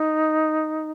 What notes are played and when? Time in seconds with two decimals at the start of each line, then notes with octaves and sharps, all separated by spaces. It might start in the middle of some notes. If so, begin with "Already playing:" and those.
Already playing: D#4